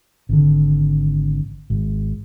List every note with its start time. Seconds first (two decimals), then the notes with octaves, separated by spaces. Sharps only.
0.29 G#1 D3
1.70 G#1